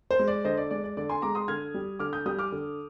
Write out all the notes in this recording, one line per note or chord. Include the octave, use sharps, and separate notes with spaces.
C5
G#3
D5
D3 C5 D#5
D5
G#3 D5
D5
D3 D5
G#5 C6
G#3 A#5 D6
C6 D#6
D3 F6 G#6
G3
D3 D6 F6
D#6 G6
G3 D#6 G6
D6 F6
D3